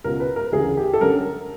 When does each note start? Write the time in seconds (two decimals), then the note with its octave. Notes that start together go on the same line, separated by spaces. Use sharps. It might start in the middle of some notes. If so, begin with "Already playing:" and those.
0.04 C#2 B2 A#4
0.20 B4
0.36 A#4
0.52 D2 C#3 E3 G#4
0.77 G4
0.94 A4
1.01 F#2 D3 A#4